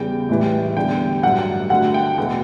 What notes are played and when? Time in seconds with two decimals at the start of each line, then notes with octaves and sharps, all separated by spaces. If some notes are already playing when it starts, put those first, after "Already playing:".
Already playing: E2 C#3 G3 G5
0.29 A1 A2 E3 G3
0.76 E2 D3 G3 G5
1.23 A1 G2 F#3 A3 F#5
1.70 D2 D3 A3 F#5
1.94 G5
2.18 E2 B2 A3